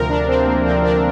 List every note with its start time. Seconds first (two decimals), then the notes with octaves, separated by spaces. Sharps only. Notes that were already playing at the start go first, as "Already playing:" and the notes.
Already playing: D2 C3 F3 A#4
0.09 D4
0.28 C4
0.47 A#3
0.65 D2 C3 F3 C4
0.84 D4